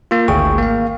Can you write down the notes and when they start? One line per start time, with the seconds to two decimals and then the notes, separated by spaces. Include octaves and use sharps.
0.11 A#3 F4
0.28 G#1 D2 G#4 G5 C#6
0.58 A#3 F5